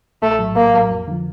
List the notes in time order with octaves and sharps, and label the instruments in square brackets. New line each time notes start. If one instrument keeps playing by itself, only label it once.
[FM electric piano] A#1 [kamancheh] A3
[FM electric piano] A2 F#3
[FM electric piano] A#1 [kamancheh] A#3
[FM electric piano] A2 F#3
F2
D3 F3